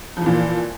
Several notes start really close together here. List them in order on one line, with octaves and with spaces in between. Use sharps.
F3 E3 A#2